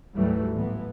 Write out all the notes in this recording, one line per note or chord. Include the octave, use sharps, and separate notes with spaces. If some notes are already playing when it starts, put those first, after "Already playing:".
D2 G#2 E3 F#3 G3 A3
A1 E3 B3